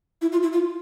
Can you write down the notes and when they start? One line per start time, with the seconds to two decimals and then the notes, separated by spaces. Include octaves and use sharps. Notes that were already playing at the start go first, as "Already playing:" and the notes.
0.22 E4
0.32 F4
0.43 E4
0.53 F4